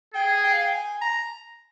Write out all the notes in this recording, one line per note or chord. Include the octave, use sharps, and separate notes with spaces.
G#4 G5
G5
F5
G5
G#5
A#5